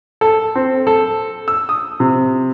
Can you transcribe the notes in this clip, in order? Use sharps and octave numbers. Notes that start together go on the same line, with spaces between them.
A4
C4
A4
E6
D#6
C3